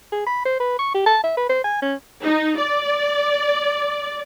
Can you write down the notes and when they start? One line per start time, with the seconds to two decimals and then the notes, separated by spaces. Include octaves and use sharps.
0.12 G#4
0.26 B5
0.45 C5
0.60 B4
0.79 C#6
0.94 G4
1.06 A5
1.24 E5
1.37 B4
1.49 C5
1.64 G#5
1.82 C#4
2.23 D#4
2.58 D5